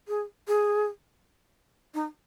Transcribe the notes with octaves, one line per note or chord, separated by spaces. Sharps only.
G#4
G#4
D#4